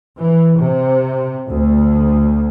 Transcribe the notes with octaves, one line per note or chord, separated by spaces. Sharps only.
E3
C3
D2